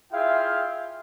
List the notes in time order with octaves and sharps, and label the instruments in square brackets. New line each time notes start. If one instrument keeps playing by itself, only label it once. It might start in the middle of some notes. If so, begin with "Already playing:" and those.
[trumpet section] E4 F4 G#4 E5 F5 G5